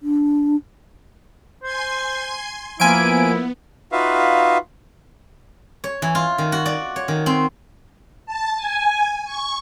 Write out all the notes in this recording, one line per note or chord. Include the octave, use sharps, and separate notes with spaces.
D4
C5 G#5 C6 G#6
F3 A#3 B3 E4 G#5 D7
D#4 F4 F#4 B4 E5 F5
C#5
E3
F4
D#3
F#4
D5
C#5
D#3
C4
A5
G#5
C#6